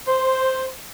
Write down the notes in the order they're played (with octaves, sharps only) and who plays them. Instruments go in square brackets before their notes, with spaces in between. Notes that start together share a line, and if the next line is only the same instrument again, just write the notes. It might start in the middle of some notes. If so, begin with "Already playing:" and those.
[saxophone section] C5